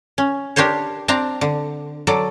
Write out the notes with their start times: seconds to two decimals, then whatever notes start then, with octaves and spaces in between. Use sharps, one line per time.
0.18 C#4
0.56 D4 G4 A#4 C5 C#5
1.08 C4 D4 A5 A#5
1.41 D3
2.07 F#3 A4 D5